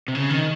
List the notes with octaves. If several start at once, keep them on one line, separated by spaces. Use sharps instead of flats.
C3
C#3
D#3